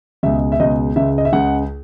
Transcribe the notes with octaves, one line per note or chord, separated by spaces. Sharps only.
C#2 B2 G#3 E5
E5
C#2 B2 G#3 D#5
C#2 C#3 G#3 E5
D#5
E5
C#2 C#3 G#3 F#5